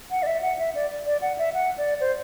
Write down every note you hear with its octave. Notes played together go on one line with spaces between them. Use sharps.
F#5
D5
E5
F#5
E5
D5
D5
F#5
E5
F#5
D5
C5